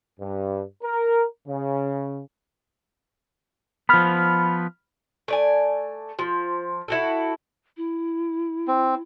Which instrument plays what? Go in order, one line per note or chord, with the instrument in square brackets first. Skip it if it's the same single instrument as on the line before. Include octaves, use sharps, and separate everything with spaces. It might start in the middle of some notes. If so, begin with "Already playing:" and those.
[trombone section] G2
A#4
C#3
[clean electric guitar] F3 B3 [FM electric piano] B5 F6
[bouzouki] A3 D5 G#5
F3
E4 F#4 A4
[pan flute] E4
[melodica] C4